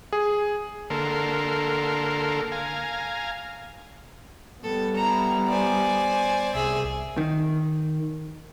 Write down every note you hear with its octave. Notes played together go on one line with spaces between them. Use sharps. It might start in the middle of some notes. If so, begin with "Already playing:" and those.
G#4
D3 A#3 A4 A#4 C6
F5 G#5 A#5
G3 B3 A4
E4 A#5
C5 D5 G#5
C2 G#4 E5
D#3